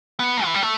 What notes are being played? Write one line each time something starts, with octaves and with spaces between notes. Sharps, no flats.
B3
E3
G3
A3